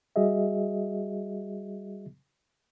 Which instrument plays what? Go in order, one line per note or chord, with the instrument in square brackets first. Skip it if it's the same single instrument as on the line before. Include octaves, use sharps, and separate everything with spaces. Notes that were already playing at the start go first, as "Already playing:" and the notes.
[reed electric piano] G3 F#4 G#4 D#5 E5